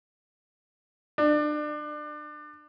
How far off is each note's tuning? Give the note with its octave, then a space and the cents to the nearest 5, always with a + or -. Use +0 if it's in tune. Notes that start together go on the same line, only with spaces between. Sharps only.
D4 +30